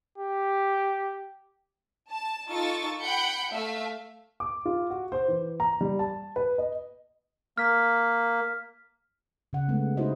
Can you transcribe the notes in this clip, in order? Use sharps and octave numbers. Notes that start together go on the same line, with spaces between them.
G4
A5
D#4 F4 A4 C#6 A6
F#5 G5 B5 G6 C#7
A3 E5 F5
D6
F4
F#4
C5
E3
A#5
G3
A5
B4
D#5
A#3 F6 B6
C#3 F#5
G#3 A3 B3
D#4 E4 F#4 C5 D#5